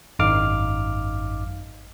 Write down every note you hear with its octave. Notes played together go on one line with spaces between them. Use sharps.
G#1 F#2 D#4 F5 D6 F6